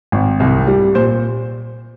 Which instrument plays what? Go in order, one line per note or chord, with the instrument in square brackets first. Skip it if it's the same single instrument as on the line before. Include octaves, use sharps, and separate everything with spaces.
[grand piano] G#1
C2
G3
A#2 C5